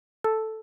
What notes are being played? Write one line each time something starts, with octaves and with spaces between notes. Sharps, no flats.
A4